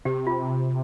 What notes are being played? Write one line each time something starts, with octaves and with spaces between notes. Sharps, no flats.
C3 G4
F4